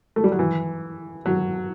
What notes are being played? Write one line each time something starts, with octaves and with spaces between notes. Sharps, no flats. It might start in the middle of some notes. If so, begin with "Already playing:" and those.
A3
G3
F#3
E3
F#3